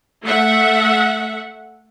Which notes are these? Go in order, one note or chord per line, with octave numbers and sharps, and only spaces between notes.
A3 E5 F#5